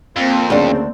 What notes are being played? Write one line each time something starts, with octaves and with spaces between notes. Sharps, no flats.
F2 A#3 C4
D2 C#3 D4